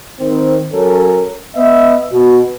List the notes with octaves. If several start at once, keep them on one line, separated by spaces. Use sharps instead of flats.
D#3 C4
F#3 C#4 A4 A#4
B3 D#5 E5
B2